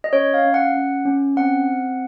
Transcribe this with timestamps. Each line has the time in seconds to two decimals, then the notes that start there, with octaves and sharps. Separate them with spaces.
0.04 D#5
0.13 C#4 C#5
0.34 F5
0.45 C#4
0.54 F#5
0.76 C#4
1.05 C#4
1.36 C4 F#5
1.68 C4